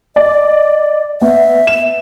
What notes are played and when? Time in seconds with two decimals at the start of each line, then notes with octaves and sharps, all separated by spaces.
0.16 D5 D#5
1.21 B3 E5
1.67 E7